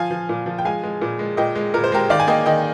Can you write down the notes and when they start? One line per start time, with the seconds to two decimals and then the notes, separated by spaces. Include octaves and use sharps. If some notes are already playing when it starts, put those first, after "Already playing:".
Already playing: F3 F5 G#5
0.11 F3
0.29 A#2
0.46 F3
0.58 G5
0.65 G#3 F5 G#5
0.83 G#3
1.02 A#2
1.19 G#3
1.37 A#2 D#5 G5
1.55 G#3
1.74 A#2 A#4
1.84 C5
1.92 G#3 G4 A#4
2.10 D#3 D5 F5
2.20 G#5
2.28 A#3 D#5 G5
2.46 D#3 D#5 G5